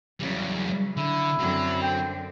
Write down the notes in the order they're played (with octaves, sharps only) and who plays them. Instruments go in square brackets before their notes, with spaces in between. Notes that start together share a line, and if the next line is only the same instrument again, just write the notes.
[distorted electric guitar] E2 G3 [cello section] C#3 E3 F#3
[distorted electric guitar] D3 [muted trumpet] E4
[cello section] F#2 D3 C4 [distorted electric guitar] F#3
[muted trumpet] G5